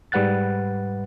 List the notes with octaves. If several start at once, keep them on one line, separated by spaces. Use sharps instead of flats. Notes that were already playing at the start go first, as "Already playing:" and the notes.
G#2 G3 B4 F#5 F#6 A6